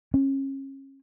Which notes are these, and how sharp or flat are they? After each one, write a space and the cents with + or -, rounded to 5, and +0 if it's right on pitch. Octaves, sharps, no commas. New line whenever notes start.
C#4 -30